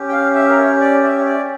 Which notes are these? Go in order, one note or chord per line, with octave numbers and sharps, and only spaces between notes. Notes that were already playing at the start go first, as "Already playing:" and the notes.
Already playing: C#4 G4
G5
F5
E5
A#4
C#5
D5
E5
C#5
D5